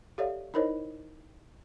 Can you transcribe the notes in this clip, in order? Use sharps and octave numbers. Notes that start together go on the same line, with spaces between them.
G4 A4 C#5 D5 E5 F5
D#4 E4 A#4 C5 C#5 D#5